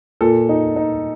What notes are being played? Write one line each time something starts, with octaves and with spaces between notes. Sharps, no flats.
A#2 A4
D#4
D#4